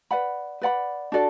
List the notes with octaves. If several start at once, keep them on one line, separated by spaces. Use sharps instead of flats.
B4 D5 F#5 B5
B4 D5 F#5 B5
D4 F#4 A4 D5